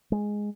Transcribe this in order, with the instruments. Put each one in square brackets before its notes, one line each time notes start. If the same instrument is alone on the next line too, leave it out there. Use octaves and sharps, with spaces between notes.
[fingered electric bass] G#3